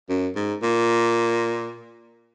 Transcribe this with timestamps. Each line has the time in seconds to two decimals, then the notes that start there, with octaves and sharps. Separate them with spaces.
0.09 F#2
0.36 G#2
0.63 A#2